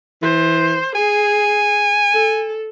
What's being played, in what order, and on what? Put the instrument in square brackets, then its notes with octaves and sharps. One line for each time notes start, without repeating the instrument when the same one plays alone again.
[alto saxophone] E3 [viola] C5
[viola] G#4 [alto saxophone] G#5
[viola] A4